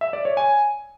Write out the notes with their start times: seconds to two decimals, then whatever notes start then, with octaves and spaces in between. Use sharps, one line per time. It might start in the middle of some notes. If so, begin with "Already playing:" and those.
0.01 E5
0.13 D5
0.25 C#5
0.37 G#5